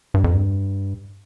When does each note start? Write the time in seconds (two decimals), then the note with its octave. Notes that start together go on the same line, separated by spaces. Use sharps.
0.14 G2
0.24 F2
0.34 G2